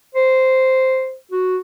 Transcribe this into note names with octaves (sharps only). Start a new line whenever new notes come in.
C5
F#4